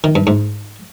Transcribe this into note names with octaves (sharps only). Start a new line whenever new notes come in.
D#3
G2
G#2